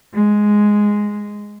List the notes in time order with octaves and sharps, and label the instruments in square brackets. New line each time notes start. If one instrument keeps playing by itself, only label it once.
[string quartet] G#3